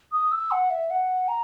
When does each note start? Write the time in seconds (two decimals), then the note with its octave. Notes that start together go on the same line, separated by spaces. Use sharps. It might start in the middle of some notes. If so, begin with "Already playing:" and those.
0.12 D#6
0.32 E6
0.51 F#5
0.70 E5
0.90 F#5
1.28 A#5